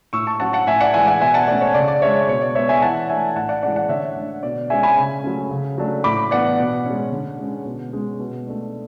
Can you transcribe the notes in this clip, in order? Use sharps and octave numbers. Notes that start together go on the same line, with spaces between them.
A2 C#6 E6
A5 C#6
F#3 C#4 F#5 A5
F#5 A5
A2 E5 G#5
D5 F#5
E3 G#3 E5 G#5
D5 F#5
B2 E5 G#5
F#5 A5
A3 C#4 D5
C#5
C#3 D5
D5
G#3 D4 C#5 E5
B2 C#5
D5
G#3 B3 C#5 E5
E5 G#5
E3 F#5 A5
A3 D4 E5 G#5
A2 F#5 A5
D5 F#5
E3 G#3 C#4 D5 F#5
D5 F#5
D3 C#5 E5
A3 D4
B2 D5
G#3 C#4 E5 G#5
G#5 B5
C#3
F#3 A3 C#4
C#3
F#3 A3 D4
A2 B5 D6
E3 B3 D4 D5 F#5
B2
G#3 C#4
D3
G#3 C#4
B2
G#3 C#4
B2
A3 D4